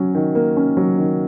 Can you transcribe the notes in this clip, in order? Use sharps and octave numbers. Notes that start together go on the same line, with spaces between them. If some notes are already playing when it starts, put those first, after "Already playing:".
Already playing: F#3 C#4
D#3
A#3
C#4
F#3
D#3